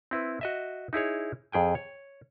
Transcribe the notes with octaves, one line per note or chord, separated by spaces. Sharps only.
C4 E4 B4
F#4 D#5 E5
D#4 E4 G#4 C#5
F2 G#4 G5 G#5
C#5